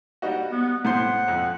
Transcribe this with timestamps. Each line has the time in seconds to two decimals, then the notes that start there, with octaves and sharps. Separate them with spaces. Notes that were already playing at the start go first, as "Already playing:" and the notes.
0.22 G3 D#4 F#4
0.51 B3
0.85 A2 C5 F#5 C6
1.28 F2